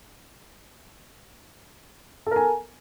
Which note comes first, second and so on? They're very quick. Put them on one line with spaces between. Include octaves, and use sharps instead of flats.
A4 A#4 G#5